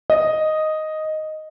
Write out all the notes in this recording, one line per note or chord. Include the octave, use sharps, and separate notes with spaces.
D#5